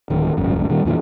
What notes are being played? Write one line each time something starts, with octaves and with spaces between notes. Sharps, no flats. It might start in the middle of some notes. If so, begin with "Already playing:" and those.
D1 D#3
D1 G#1 C#2 F#2
A#2 D#3 G3
F2 A#2 D#3 E3